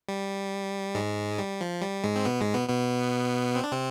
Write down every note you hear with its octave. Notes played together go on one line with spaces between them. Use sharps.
G3
G#2 G#3
G3
F3
G3
G#2 G#3
C4
B2 B3
G#2 G#3
B2 B3
B2 B3
C4
D4
C3 C4